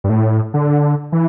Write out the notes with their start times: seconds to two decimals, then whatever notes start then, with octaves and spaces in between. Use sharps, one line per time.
0.04 G2
0.09 A2
0.54 D3
1.12 E3